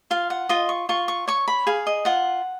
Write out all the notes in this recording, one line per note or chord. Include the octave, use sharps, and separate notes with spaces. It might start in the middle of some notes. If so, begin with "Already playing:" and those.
F4 F5
F#5
F4 D#5
C#6
F4 C#6
C#6
C#5 C#6
B5
G#4 F5
D#5
F4 F#5